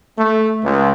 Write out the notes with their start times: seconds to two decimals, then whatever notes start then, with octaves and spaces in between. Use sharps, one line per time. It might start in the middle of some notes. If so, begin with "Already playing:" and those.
0.17 A3
0.62 C#2